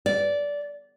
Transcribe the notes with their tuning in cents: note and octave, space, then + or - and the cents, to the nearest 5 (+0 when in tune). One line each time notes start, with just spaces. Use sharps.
D5 -15